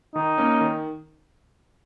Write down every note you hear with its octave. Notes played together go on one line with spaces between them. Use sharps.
D#3 D#4
A#3 C#4
D#3